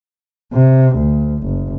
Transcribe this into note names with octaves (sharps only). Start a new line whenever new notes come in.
C3
D2
F#1